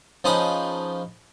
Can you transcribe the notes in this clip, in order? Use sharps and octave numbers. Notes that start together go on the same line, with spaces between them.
F3 C#4 D#4 G#4 B4 D#6